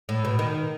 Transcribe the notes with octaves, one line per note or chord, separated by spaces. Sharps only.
A2
B2
D#3